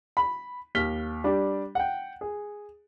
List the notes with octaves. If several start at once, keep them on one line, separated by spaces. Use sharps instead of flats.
B5
D#2 F6 B6 G7
G3 D4 G4
F#5 G5
G#4